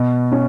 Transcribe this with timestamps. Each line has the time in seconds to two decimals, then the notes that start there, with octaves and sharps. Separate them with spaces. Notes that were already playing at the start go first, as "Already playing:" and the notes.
Already playing: B2
0.32 C#4